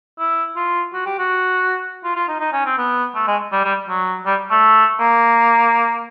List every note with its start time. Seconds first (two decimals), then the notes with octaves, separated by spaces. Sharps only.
0.19 E4
0.56 F4
0.93 F#4
1.06 G4
1.18 F#4
2.04 F4
2.16 F4
2.28 D#4
2.40 D#4
2.53 C#4
2.65 C4
2.78 B3
3.15 A3
3.27 G#3
3.52 G3
3.64 G3
3.88 F#3
4.26 G3
4.51 A3
5.00 A#3